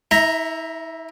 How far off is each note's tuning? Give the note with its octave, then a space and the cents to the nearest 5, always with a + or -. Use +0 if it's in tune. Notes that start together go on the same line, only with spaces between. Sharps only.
E4 -45 E5 +0 A#5 +0